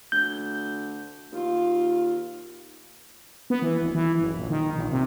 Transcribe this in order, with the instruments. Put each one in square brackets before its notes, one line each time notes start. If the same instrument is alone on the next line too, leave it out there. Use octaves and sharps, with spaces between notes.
[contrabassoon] D2 [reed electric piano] G6
[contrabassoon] D#2 [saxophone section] F4
[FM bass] B3
E3
D1
E3
F#1
A#1
D#3
A#1
C3